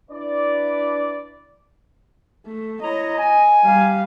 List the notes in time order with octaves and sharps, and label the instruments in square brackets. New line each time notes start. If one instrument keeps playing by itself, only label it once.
[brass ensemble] D4 E4 B4 D5
[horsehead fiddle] A3
[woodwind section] E4 C#5 A#5 [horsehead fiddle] D#5
[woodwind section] G#5
[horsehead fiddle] G3 F5